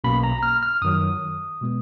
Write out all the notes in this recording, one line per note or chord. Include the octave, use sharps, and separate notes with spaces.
B1 B2 A#3 C#4 B5
A#5
F6
F6
F#2 D#3 F#3 D#6
B2 G#3 B3